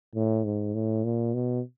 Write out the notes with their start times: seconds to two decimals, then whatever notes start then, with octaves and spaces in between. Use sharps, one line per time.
0.15 A2
0.44 G#2
0.74 A2
1.04 A#2
1.34 B2